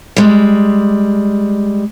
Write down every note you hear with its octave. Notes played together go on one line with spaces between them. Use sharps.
G3 G#3